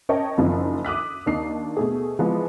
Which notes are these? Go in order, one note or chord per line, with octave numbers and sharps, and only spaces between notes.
C#4 A#4 C#5 D#5 G5 A5
F#1 F#2 D#3 F3
D6 D#6 F#6 B6
D#2 D4 D#4 C7
B2 A3 G#4
E3 F3 G#3 B3